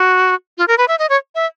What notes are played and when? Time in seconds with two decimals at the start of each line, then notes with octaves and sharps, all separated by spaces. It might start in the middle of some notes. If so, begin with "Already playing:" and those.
Already playing: F#4
0.58 F4
0.68 A#4
0.78 B4
0.88 E5
0.99 D#5
1.09 C#5
1.35 E5